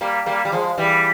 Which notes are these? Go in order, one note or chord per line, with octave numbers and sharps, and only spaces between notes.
G3 A#3
G3 A#3
G3
F3 G#3
E3 G3